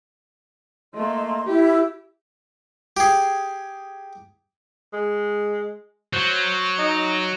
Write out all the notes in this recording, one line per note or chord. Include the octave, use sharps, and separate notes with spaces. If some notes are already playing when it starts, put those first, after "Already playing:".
A3 A#3 D#5 C6
E4 G4
G4 G#4
G#3
F#3 C5
D#4